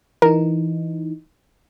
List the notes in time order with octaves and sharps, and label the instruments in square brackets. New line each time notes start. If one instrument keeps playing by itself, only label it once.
[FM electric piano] E3 D#4 [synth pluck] A#4